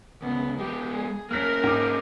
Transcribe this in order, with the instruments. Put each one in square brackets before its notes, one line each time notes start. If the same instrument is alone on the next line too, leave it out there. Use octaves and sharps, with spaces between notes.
[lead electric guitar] D2 C#3 [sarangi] B3
[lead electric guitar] G#3 B3 [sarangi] G4
[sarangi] G#4
[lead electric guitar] A#3 C#4 [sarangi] A#4 [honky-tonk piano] F6 F#6 B6
[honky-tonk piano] G#2 D6